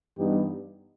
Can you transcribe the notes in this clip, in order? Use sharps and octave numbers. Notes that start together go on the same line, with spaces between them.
G2 E3 B3 D#4 G4